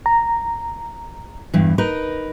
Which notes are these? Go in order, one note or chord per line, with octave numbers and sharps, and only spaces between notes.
A#5
E2 G2 E3
D#4 A#4 B4